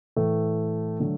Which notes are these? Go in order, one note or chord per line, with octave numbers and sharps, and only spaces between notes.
A2 E3 A3
D3 F#3 A3 F#4